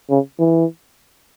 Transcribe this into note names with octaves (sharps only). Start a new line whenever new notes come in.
C#3
E3